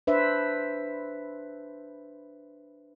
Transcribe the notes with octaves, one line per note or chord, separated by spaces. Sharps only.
D4 B4 C5 E5